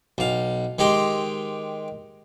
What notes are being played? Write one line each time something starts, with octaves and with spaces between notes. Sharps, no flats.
B1 F5
D#3 G#3 G4 C5